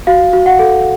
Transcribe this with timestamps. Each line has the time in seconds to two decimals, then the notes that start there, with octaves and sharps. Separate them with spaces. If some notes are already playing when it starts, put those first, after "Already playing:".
0.07 F#4 F5
0.33 F#4
0.46 F#5
0.59 A4